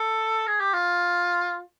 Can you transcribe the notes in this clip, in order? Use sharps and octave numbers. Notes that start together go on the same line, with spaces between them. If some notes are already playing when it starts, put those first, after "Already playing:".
Already playing: A4
G#4
G4
F4